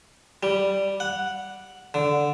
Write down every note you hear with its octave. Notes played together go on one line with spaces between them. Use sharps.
G3
F#5
D3